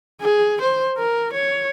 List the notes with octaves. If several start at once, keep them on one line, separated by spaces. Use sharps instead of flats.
G#4
C5
A#4
C#5